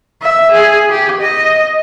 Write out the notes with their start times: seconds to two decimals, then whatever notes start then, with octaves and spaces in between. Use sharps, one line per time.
0.22 E5
0.52 G#4
0.90 G4
1.21 D#5